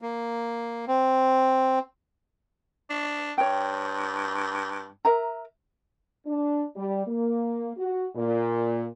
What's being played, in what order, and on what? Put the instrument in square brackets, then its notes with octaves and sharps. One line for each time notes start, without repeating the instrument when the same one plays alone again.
[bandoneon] A#3
C4
[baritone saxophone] D4
[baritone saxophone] G2 [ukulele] C#5 G5
[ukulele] A#4 E5 A#5
[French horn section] D4
G3
A#3
F#4
A#2